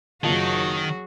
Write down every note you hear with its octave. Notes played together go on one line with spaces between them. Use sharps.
F#1 D#3 F#3 F4 F#4 G#4 A5